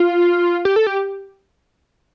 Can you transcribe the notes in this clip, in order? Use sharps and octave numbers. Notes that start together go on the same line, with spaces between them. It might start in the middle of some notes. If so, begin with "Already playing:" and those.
Already playing: F4
G4
A4
G4